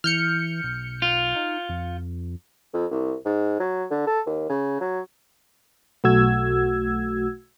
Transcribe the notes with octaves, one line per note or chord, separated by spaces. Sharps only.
E3 F6 G6 C#7
B1
F4
D#4
F2
F2
C2
G#2
F#3
D3
A4
D#2
C#3
F#3
B1 A3 F#4 E6 G#6